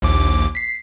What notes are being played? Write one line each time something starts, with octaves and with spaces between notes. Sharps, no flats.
A#1 D#2 D6
B6 C7